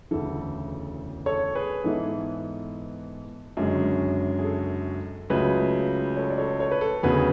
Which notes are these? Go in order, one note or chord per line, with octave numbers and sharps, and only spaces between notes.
E1 D2 C#3 E3 A4
A4 C#5
G#4 B4
G#2 E3 B3 E4 A4
F#1 F#2 D3 G#3 C#4
G#4
A4
C#2 C#3 F#3 A3 G#4 B4
A4 C#5
D5
A4 C#5
A4 C#5
B4
A4
E1 D2 C#3 F#3 B3 G#4 B4